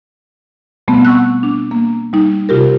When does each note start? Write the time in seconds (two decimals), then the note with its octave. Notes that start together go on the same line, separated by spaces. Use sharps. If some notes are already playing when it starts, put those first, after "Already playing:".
0.88 B2 G3 A3 B3 C4
1.05 F#5 C#6 E6 F#6
1.43 D4
1.71 A#3
2.13 G3 D#4
2.49 C3 F4 G4 A#4